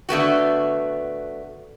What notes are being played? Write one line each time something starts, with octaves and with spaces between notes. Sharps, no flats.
D3 A3 B3 F#4